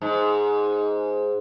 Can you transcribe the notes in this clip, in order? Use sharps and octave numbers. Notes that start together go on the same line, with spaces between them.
G#2